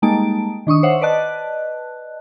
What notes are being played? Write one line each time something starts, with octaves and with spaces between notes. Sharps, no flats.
G3 G#3 A#3 D#4 A5 D7
D#3 D4 C#6 D#6
C5 C#5 E5 F#5
B4 D5 D#5 A5 F#6